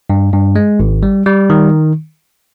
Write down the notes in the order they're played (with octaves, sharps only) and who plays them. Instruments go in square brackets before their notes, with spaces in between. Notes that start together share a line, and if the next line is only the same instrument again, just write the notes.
[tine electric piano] G2
G2
G#3
G#1
G3
G3
D#3